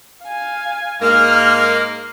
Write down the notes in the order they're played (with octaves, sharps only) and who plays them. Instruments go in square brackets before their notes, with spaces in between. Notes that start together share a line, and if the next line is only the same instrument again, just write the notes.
[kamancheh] F5 G#5
[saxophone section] G#2 G#3 A#3 [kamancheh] F6